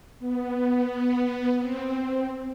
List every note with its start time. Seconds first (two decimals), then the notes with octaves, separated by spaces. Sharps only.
0.19 B3
1.60 C4